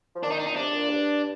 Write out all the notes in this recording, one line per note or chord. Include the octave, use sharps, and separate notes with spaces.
F3
D#3 D4
D#4
D4
A#2 D#4
C3 D4
A#2
G2